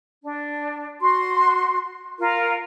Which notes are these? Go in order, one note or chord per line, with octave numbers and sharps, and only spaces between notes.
D4
F#4 C6
F4 A#4